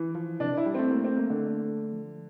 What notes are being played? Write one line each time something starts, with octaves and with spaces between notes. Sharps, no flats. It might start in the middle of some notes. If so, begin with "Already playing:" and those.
Already playing: E3
F3
C3 D4
E4
G3
A3 C4
A#3
C4
A#3
D3
F3